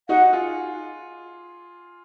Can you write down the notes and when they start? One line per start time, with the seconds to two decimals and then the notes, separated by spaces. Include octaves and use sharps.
0.09 D#4 F#4 F#5
0.33 F4 G#4